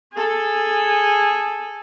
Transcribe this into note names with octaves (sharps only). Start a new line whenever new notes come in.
G#4 A4